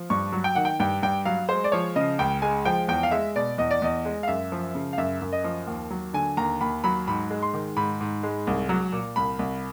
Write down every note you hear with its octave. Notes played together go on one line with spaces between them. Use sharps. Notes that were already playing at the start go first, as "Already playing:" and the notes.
Already playing: F3
G2 C#6
F#3
G5
D#3 F#5
G5
G2 G5
G2 G5
F#3 F5
G#3 C5
D5
F3 C#5
C#3 D#5
C#2 G5
G#3 G#5
F3 G5
E2 G5
F5
G#3 E5
B2 D5
E2 D#5
D5
E2 D#5
G#3
F5
F#2 E5
F3
C#3
F5
F#2 E5
F#2
D#5
F3
D#2
F#3
D3 G#5
D#2 A#5
D#2 B5
F#3 B5
G#2 B5
G#3
C6
D#3
G#2 B5
G#2
G#3
C2
F#3
A#2
C2 B5
C2